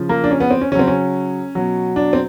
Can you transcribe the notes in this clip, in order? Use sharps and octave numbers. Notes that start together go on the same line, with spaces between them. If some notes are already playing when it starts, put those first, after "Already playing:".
Already playing: C#3 F3
A#3
D4
C#4
B3
C4
C#4
C#3 F#3 C4 C#4
C#4
B2 F#3
D4
C4